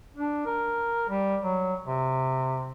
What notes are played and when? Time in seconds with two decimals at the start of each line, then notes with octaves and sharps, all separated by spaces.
0.16 D4
0.46 A#4
1.09 G3
1.42 F#3
1.86 C3